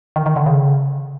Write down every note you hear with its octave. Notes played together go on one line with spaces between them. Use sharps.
D#3
D#3
D3
C#3